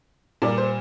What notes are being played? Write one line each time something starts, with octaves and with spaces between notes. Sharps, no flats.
A#2 G3 A#3 D5
C5